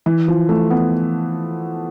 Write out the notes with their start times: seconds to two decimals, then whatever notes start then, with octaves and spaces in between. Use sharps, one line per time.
0.06 E3
0.28 F3
0.49 A3
0.70 B3